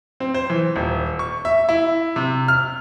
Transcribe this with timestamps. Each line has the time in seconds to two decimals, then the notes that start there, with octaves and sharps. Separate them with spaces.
0.20 C4
0.34 C5
0.50 E3
0.76 D#1
1.19 C#6
1.45 E5
1.69 E4
2.16 C3
2.48 F6